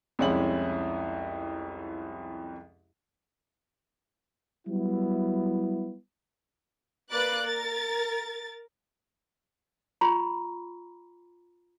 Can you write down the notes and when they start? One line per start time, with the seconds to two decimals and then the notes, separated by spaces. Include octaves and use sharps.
0.19 C2 F2 G#3 C#4 E4 F#7
4.67 F#3 G3 B3 E4
7.12 A#3 B4 D5 D6 F#6 A6
7.45 A#4 A6
10.01 F4 A#5 B5 C#6